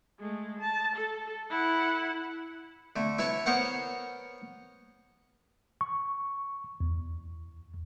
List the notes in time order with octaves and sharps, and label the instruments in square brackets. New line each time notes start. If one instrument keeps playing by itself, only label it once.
[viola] G#3 A3
A5
A4
E4 F#5
[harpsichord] D3 A3
E4 B4 C#5 A5
B3 A#4 C5 C#5 F#5
[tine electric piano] C#6
E2